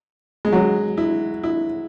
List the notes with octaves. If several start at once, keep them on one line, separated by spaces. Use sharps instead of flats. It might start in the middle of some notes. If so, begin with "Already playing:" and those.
G#3
F#3
E4
E4